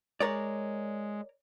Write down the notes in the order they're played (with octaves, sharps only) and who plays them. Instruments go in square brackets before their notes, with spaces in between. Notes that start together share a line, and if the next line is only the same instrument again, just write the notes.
[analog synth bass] G#3 [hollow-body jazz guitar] A#4 C#5 D5